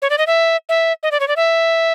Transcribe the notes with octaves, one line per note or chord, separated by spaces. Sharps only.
C#5
D5
D#5
E5
E5
D#5
D5
C#5
D5
E5